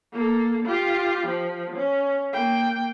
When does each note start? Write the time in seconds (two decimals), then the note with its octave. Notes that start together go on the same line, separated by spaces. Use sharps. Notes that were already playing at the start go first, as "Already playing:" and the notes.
0.13 A#3 A4
0.66 F4 G4
1.27 F3
1.76 C#4
2.33 A#3 G5